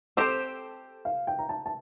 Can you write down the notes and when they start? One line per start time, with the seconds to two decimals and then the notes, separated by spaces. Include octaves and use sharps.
0.17 C4 G4 A4 C5
1.05 F5
1.27 G5
1.39 A#5
1.49 A5
1.66 A5